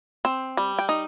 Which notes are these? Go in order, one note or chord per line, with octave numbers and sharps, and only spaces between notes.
C4
G3
G5
D#4